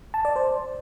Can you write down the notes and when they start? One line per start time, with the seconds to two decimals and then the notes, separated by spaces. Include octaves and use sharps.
0.14 A5
0.25 D5
0.36 C5